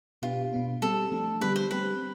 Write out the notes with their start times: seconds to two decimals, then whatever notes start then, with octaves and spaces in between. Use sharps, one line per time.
0.22 B2 B3 D4 F4 G4
0.53 B2 B3 D4
0.82 G3 C4 G4 A4
1.12 F3 A3 D4
1.41 D3 G3 B3 D4 G4 B4
1.56 C5
1.71 G3 C4 G4 B4